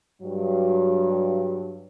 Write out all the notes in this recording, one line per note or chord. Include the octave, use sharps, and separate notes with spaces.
G2 F#3